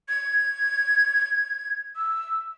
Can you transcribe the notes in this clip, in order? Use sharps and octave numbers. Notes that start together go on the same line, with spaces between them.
G#6
E6